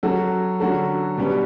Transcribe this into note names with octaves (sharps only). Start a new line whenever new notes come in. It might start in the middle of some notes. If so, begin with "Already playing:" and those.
F#3 C#4 F#4 A4
D3 F#3 C#4 F#4 A4
B2 G3 C#4 G4 B4